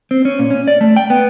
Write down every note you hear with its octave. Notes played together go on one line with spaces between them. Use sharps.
C4
C#4
A#2
C#4
D5
A3
G5
B3